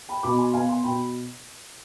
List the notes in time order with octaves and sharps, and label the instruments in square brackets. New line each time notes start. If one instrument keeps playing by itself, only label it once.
[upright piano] G5 B5
B2 B5 D6
G#5 C6
B3 F5 G#5
G#5 C6
B2 G5 B5